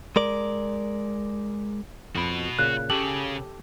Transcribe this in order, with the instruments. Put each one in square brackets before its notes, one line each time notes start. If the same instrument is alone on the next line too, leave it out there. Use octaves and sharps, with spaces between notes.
[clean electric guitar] G#3 A#4 D5
[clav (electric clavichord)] F2 [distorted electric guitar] F#4 B5
[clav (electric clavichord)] A#2 C#3 [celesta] F#6
[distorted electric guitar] C#3 [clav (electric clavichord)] G4 A4 [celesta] F#7